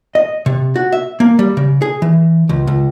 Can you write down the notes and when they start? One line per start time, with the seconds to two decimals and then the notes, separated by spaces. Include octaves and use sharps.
0.15 D#5
0.46 C3
0.76 F#4
0.92 E5
1.20 A#3
1.39 G3
1.57 C#3
1.82 G#4
2.02 E3
2.49 C#2
2.67 C#2